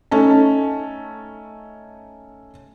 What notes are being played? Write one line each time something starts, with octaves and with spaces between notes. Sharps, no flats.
A3 C#4 D#4 A5